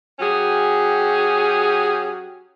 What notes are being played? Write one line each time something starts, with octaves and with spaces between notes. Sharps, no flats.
F#3 C#4 G4 G#4